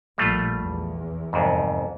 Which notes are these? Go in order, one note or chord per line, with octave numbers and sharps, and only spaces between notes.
A#1 A#2 G3 A3 F4
E2
C2 F2 G#2